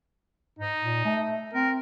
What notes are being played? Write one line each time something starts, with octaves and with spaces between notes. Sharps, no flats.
G#2 D#4
A#2
A3
C4 A#4